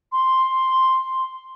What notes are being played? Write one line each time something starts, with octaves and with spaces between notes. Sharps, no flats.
C6